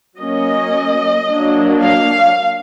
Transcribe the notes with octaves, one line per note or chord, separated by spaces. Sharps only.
F#3 A#3 C#4 D#5
F#3 A#3 D4
F5